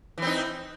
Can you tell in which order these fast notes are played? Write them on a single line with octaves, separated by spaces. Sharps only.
E3 C4 D#4